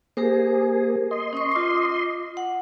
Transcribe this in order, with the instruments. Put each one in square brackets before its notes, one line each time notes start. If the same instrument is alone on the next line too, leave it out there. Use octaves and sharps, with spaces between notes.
[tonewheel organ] A#3 G#4 [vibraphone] G4 A#4 C5
[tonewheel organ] D#5 C6
[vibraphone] C#4 C#6
F4 D6
F#5